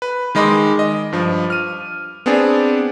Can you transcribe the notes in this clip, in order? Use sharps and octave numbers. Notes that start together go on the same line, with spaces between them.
B4
D#3 G#3 D#5 B5 C6 D6
D#5
G2 F3
F6 D#7
B3 C4 D4 G#4 D5